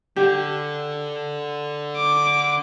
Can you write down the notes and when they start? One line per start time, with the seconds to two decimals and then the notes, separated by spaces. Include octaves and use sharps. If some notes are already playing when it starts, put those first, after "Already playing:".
0.16 D3 G4
1.96 D6